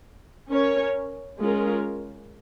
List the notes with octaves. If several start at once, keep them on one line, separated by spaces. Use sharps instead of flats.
C#4 A#4 C#5
G#3 C#4 F4 A#4